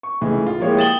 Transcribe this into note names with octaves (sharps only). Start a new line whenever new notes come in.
C#6
C#2 A2 E3
F4
F3 G#3 A#3 E4 G4 C#5
G5 D#6 A6 E7 F#7 G7